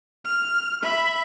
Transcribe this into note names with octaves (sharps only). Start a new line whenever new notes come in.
F6
E5 B5